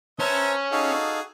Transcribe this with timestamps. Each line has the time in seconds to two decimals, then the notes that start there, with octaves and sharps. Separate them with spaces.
0.19 C#4 B4 C5 E5 A5 A#5
0.72 D#4 F#4 G#4 A4 F5